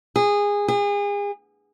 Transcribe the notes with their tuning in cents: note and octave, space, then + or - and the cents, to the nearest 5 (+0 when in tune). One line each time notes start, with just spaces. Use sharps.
G#4 -20
G#4 -35